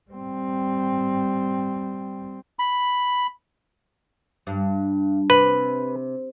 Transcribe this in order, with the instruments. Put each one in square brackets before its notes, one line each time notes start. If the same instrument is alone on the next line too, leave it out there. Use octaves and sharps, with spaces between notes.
[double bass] G3 C4
[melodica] B5
[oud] G2
[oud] C3 [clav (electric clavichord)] B4